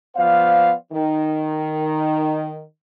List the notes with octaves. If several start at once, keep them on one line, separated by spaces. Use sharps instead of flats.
F3 B3 C5 D5 F5
D#3